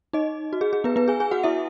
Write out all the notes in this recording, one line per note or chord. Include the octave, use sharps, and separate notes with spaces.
D#4 D#5
F#4
G#4
G#4
B3 B4
B3 B4
G#4 G#5
G#4 G#5
F#4 F#5
E4 E5